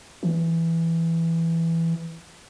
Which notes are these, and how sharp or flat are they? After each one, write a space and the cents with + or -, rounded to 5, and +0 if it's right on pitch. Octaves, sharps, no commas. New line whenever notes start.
E3 +5